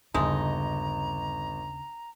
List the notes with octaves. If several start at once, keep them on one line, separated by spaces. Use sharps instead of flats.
G1 D#2 C#3 G#3 A3 D#4 A#5